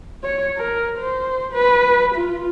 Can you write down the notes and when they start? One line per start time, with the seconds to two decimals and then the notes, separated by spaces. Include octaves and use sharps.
0.23 C#5
0.57 A#4
0.98 C5
1.53 B4
2.15 F4